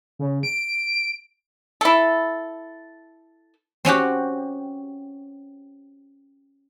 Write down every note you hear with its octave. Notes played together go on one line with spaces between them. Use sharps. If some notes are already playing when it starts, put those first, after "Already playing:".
C#3
D7
E4 A4
C4 C#4 F#4 G4